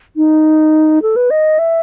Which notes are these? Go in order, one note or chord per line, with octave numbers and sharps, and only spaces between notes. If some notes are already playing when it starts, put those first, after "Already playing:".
D#4
A4
B4
D#5
E5